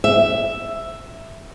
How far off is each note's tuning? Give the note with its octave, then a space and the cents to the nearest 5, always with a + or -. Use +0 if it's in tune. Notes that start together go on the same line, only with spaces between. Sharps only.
E5 +5